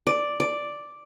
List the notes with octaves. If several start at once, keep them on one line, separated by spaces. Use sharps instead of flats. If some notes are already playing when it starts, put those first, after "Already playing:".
D5
D5